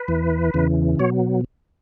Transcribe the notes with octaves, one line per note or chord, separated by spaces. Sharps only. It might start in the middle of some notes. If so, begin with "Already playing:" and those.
Already playing: B4
E2 E3
E2 C#3 E3
B2 F#3 C#5